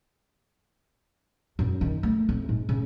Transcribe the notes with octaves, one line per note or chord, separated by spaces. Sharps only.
F#2
D#3
A3
F2
G#2
C#3